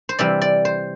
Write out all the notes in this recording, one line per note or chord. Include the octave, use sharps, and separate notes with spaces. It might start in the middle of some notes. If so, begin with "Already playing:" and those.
C5
C3 E3 G3 D5
D5
C5